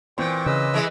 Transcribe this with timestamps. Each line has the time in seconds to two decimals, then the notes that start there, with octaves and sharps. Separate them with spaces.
0.18 A#2 E3 C4 C5 G5 C#6
0.46 C#3 B4 D#5 E6
0.74 E3 G#3